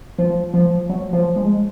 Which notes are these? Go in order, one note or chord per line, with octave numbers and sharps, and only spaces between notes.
F3
F3
F#3
F3
G#3